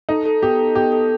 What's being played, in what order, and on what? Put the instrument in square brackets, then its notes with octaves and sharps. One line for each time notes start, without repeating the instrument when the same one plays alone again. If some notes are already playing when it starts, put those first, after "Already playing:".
[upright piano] D#4 [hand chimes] A4
[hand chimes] A4
[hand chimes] B3 [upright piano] G4
[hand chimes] A4
[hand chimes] B3 [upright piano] G4
[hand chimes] A4